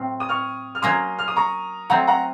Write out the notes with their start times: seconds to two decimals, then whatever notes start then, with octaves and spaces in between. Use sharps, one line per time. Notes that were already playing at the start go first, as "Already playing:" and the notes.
Already playing: A2 F#3 C4 F4
0.20 D#6
0.29 C#6 F6
0.75 F6
0.82 F#3 A#3 C#4 C6 D#6
1.19 F6
1.28 D#6
1.36 A#5 C#6
1.90 F#3 A3 C4 F#5 A#5
2.07 F#5 A#5